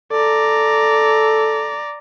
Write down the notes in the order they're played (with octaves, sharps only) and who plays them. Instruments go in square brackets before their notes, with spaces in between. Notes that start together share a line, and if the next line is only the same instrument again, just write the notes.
[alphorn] A4 [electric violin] D5 A#5